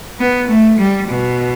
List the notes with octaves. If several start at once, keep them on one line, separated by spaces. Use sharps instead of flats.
B3
A3
G3
B2